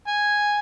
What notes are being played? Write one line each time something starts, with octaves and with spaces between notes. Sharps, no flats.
G#5